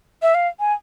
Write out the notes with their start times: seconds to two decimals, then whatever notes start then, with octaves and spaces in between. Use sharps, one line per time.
0.22 E5
0.35 F5
0.60 G#5